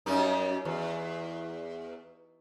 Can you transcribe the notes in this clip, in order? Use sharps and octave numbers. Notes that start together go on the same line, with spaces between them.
F#2 G3 D#4
E2